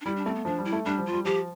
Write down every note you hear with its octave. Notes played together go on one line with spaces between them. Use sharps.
D4
G3 E4
D4
A3 C4
B3
F3 D4
G3
E4
A3
G3 D4
F3
F4
G3
F3 G4